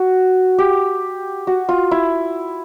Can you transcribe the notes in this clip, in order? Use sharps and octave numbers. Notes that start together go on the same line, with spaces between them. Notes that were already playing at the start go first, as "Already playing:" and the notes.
Already playing: F#4
G4
F#4
F4
E4